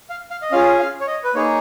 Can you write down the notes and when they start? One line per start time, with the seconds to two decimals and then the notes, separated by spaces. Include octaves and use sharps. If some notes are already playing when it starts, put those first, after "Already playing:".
0.10 F5
0.31 F5
0.42 D#5
0.51 C#4 F4 G#4 F5
0.79 F5
1.00 C#5
1.07 D#5
1.24 B4
1.35 A#3 D#4 G#4 C#5